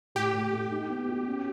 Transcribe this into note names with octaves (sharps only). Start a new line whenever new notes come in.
A2 G4
A2
A3
D#4
B3
F#4
C#4